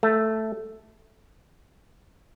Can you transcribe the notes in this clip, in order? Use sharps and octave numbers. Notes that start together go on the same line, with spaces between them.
A3